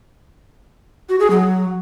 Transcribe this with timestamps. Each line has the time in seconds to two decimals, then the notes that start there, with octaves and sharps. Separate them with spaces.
1.09 F#4
1.20 G#4
1.30 F#3